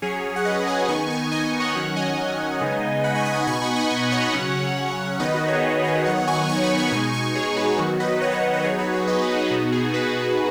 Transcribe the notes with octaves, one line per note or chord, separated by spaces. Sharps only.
F#3 C#4 G#4 C#5
F#5
B4 D#5
D#5 G#5
D#3 B3 D#4 G#5 C#6
G#5 C#6
D#5 G#5
D#5 G#5
C#5 F#5
D#3 F#3 C#4 C#5 F#5
D#5 G#5
C#3 G#3 B3 D#4
F#5 B5
G#5 C#6
B5 D#6
D#5 G#5
B2 B3 D#4 G#5 C#6
F#5 B5
D#5 G#5
D#5 G#5
C#5 F#5
C#3 F#3 C#4
D#3 B3 D#4 B4 D#5
F#4 B4
G#4 C#5
G#4 C#5
D#3 F#3 B3 D#4 C#5 F#5
G#5 C#6
G#5 C#6
F#5 B5
G#5 C#6
B2 G#3 D#4 G#5 C#6
G#5 C#6
G#4 C#5
F#4 B4
D#3 F#3 B3 D#4 F#4
B4 D#5
C#5 F#5
C#5 F#5
C#5 F#5
B4 D#5
F#3 B3 D#4 G#4 C#5
F#4 B4
G#4 C#5
B4 D#5
F#4
G#4
B2 B3 D#4 F#4
G#4
F#4 B4